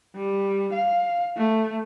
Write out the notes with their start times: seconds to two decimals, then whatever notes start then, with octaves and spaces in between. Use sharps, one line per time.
0.15 G3
0.73 F5
1.37 A3